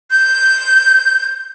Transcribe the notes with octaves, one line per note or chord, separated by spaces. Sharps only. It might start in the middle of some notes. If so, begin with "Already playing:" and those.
G6